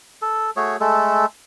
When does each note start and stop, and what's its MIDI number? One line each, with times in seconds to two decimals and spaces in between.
0.22 0.50 69
0.56 0.77 57
0.56 0.77 66
0.56 0.77 68
0.56 0.77 73
0.80 1.26 56
0.80 1.26 57
0.80 1.26 69